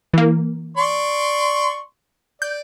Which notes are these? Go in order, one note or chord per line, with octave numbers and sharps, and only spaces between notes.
E3 A#3
D5 C6 C#6
D5 G6